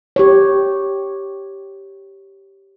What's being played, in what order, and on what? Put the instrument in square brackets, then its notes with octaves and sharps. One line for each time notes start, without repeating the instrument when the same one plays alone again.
[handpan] G4 C#5